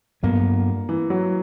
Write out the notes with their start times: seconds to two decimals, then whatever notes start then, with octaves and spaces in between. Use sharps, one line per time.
0.23 G2 F#3 A#3 B3
0.89 E3
1.10 F#3